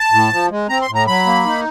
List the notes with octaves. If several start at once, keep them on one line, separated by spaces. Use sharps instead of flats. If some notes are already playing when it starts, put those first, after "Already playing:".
Already playing: A5
A2
F3
G#3
C4 A#5
C6
A2
A#5
F#3 B5
A#3
D#4